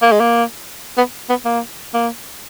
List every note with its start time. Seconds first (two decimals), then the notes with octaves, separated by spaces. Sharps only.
0.02 A#3
0.12 G#3
0.20 A#3
0.98 B3
1.30 B3
1.45 A#3
1.94 A#3